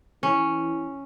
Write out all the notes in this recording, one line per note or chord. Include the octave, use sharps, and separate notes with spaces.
E3 C#4